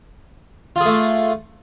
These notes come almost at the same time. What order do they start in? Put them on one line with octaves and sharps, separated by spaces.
F4 G#4 A3